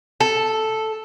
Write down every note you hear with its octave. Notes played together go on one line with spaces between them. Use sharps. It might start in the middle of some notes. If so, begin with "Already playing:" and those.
A4